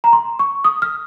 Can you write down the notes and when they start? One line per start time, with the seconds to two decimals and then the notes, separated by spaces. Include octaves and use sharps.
0.04 A#5
0.13 C6
0.39 C#6
0.64 D#6
0.82 F6